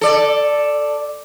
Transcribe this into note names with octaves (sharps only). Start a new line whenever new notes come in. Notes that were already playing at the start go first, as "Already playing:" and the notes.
A4 D5